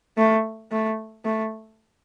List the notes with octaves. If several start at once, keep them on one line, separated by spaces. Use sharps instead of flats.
A3
A3
A3